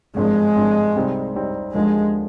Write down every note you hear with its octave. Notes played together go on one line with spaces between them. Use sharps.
G#1 G2 F3 G#3
G#1 G2 F3
C2 C3 G3 C4 D#4
C2 C3 G3 C4 D#4
D#2 D3 F3 G#3